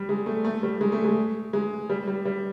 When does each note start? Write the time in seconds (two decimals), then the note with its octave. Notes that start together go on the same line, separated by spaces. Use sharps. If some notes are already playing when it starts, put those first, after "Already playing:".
Already playing: G3
0.09 G#3
0.26 A3
0.45 A3
0.63 G3
0.81 G#3
0.92 A3
1.04 G#3
1.53 G#3
1.90 G3
2.07 G3
2.25 G3